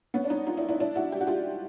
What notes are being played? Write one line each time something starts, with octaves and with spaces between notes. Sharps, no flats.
B3 C#4
D4
C#4 D#4
D#4 F4
D4 E4
D4 E4
D4 E4
E4 F#4
G4
F#4
F4 G4